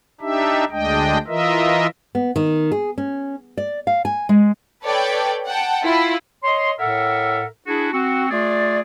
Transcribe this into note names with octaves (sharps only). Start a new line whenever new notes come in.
D4 D#4 G4 E5
D2 G#3 D4 D#5 G5
E3 F4 A#4 D#5 E5
B3
D#3
G#4
C#4
D5
F5
G#5
G#3
A4 B4 C#5 D5 G5
F#5 G5 A5
E4 F4
C#5 D#5 C6
A2 A4 A#4 E5 F#5
D4 E4 F#4 G#4
C4 F#4
A3 F4 G#4 D5